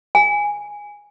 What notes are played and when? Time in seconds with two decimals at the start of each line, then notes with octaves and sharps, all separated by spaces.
0.15 G#5